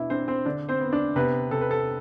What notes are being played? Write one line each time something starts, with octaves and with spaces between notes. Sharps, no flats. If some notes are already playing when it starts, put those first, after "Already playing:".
Already playing: B2 D4 E4 E5
C4 D4 C5
C4 C5
D3 D4 D5
C4 C5
B3
D4 D5
C3 B3 B4
C3 A4
B4
A4